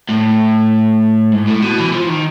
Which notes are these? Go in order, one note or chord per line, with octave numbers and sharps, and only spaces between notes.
A2
G#2
A2
B2
E3
F3
D#3